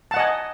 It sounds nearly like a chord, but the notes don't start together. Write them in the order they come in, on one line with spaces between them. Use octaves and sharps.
A5 F#5 D#5 G#5